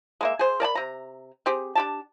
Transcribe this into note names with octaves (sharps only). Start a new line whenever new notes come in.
G#3 A#3 E5
G#4 C5
A#4 D5 A5 B5
C3 A#5
C4 G4 G#4
D4 G4 A5